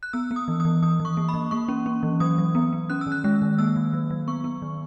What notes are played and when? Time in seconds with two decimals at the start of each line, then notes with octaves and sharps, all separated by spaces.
0.03 F#6
0.13 B3 E6
0.31 B3
0.36 D#6
0.48 E3
0.60 D#6
0.65 E3
0.83 E3 D#6
1.00 E3
1.05 C#6
1.17 A#3
1.29 B5
1.34 E3
1.51 A#3 C#6
1.68 C#4
1.86 C#4
2.03 E3
2.20 F#3 D#6
2.38 F#3
2.55 B3
2.73 B3
2.90 C#4 F#6
3.01 E6
3.06 D#3
3.12 F#6
3.24 G#3 F#6
3.42 D#3
3.59 A#3 E6
3.76 F#3
3.93 F#3
4.10 F#3
4.28 B3 C#6
4.44 B3
4.62 D#3